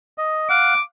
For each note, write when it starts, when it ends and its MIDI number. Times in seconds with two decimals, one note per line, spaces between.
0.18 0.48 75
0.50 0.74 77
0.50 0.74 78
0.50 0.81 86